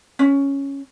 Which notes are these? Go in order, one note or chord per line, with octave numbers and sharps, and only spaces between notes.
C#4